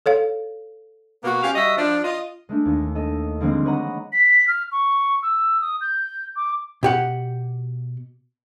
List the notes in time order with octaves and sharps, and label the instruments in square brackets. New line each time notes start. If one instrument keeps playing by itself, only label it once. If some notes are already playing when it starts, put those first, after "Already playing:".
[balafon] A4 C#5 F5
[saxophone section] B2 A#3 B3 F#4
C#4 G4 F5
G3 F#4 D#5 E5
F3 D4
F4 D#5
[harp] G#3 A3 D4
D#2
A4 D#5
D3 F3 G3 G#3 A#3 C4
B4 C#5 D#5 F#5 A#5
[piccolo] B6
F6
C#6
E6
D#6
G6
D6
[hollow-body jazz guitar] B2 G4 F#5